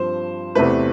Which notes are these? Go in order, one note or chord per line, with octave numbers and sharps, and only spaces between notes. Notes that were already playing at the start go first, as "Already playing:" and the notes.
Already playing: G2 F3 C4 C5
E2 C3 E3 A3 C4 B4